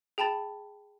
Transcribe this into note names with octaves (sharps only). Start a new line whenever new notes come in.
G#4 G5 A5 B5 A6